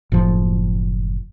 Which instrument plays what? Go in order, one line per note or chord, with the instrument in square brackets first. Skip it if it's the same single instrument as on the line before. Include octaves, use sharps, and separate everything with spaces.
[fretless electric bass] F#1 A2 F3